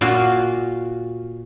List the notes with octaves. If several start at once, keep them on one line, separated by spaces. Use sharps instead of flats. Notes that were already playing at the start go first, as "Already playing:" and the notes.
A#2 F4 F#4